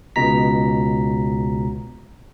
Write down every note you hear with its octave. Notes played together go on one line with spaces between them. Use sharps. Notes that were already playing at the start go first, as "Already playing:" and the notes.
C#2 B2 A#5 B6